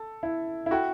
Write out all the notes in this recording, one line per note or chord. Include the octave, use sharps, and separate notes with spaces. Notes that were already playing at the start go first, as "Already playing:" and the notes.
Already playing: A4
E4
E4
F#4 A4 E5 G5 B5